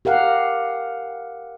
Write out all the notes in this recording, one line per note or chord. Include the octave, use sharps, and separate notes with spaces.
G4 A#4 F5 F#5